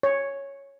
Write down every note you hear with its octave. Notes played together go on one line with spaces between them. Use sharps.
C#5